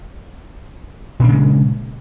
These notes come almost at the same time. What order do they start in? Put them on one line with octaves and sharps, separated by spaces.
A#2 D4 C#3 G#3